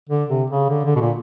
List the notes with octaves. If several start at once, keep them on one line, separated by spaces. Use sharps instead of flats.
D3
C3
C#3
D3
D3
B2
A#2